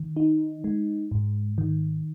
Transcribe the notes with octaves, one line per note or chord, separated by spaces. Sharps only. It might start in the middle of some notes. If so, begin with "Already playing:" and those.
Already playing: D#3
D#4
G#3
G#2
D#3